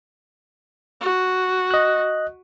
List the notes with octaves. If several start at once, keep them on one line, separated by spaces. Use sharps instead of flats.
F#4
D#5 F#6